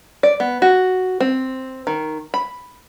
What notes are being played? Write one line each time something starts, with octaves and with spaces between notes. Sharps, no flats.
D5
B3
F#4
C4
D#3
B5